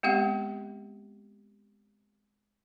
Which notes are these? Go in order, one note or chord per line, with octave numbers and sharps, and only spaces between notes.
G#3 B3 C4 G4 F5 F#5